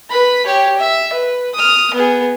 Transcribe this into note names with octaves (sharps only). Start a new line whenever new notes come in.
B4 B5
G4 C#5
E5
B4
D#6 F6
B3 G#4